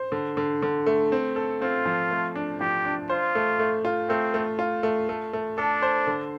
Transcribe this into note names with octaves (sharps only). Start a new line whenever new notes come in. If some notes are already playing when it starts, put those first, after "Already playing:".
Already playing: C5
D3
D3
D3
A3
C4
A4
C4 F4
F3
A3
D4
F3 G4
D4
F4 C5
A3
A3
F4
A3 C4
A3
F4
A3
A3
A3
D4 A4
C5
D3